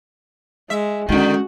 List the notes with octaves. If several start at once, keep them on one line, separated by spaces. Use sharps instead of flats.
G#3 E5
D3 D#3 G#3 C#4 F#4